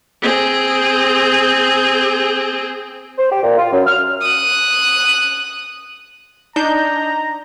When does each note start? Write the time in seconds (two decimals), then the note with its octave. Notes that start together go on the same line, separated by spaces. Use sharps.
0.22 C4 G#4
3.18 C5
3.31 G4
3.43 A#2
3.58 F4
3.71 F#2
3.87 F6
4.22 D#6 F#6
6.56 D4 D#4 A#5 G6